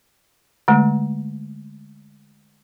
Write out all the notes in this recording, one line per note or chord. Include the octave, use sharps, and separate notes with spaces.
D3 G#3 A3